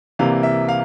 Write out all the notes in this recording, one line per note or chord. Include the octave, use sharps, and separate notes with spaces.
C2 C3 E3 A#3 F5
E5
F5